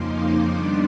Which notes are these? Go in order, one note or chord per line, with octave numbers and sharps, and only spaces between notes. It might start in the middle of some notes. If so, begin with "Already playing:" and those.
Already playing: F2 C#3 F3 A#3 D#4 C6 D6
D#3 G3 B3 D4